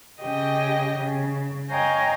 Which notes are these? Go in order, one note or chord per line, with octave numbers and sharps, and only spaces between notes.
C#3 G4 D#5 G5
C#3
C#5 D#5 F5 G5 G#5 A#5